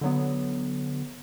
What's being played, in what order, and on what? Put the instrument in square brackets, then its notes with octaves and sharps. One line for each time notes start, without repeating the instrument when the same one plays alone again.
[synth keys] D3 F#3 B3